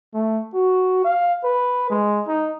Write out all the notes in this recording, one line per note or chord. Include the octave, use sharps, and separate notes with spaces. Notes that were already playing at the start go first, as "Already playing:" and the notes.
A3
F#4
F5
B4
G#3
D#4